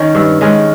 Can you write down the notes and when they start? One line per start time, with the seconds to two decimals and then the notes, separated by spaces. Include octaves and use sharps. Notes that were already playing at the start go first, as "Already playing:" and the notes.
Already playing: D#3 C#4
0.15 G2
0.41 D#3 G#3 C#4